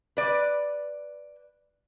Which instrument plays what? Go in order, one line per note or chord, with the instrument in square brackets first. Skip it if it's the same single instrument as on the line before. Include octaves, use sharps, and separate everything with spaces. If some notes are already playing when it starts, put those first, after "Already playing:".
[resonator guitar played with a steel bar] B4 D5